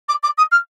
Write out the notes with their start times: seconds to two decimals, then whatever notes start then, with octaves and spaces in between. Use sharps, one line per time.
0.08 D6
0.23 D6
0.37 D#6
0.51 F6